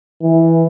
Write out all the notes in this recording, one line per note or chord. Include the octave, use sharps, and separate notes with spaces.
E3